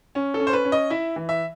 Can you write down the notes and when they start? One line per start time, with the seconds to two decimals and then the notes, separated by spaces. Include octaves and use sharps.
0.15 C#4
0.34 A4
0.40 C#4
0.47 C5
0.53 B4
0.65 C#4
0.72 D#5
0.90 E4 E5
1.16 E3
1.29 E5